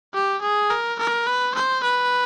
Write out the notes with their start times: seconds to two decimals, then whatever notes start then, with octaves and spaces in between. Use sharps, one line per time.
0.14 G4
0.42 G#4
0.70 A#4
0.99 A#4
1.27 B4
1.55 C5
1.83 B4